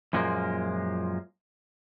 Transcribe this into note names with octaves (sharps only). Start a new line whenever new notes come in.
F#2 A#2 F3 G#3 A#3